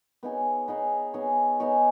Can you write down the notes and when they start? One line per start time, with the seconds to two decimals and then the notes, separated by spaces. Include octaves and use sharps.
0.23 B3 D#4 G#4 C#5
0.68 B3 D#4 G#4 C#5
1.13 B3 D#4 G#4 C#5
1.60 B3 D#4 G#4 C#5